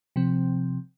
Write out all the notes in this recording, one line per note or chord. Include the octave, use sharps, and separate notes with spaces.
C3 F3 C4